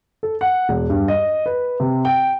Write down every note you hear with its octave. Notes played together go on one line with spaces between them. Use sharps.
A4
F#5
E1
G2
D#5
B4
C3
G5